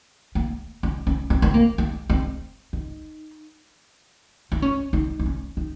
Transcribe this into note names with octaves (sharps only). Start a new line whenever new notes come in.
A#3
C#4
C#4
C4
C4
A#3
A#3
C4
D#4
D#4
C#4
D#4
D#4
C#4
D#4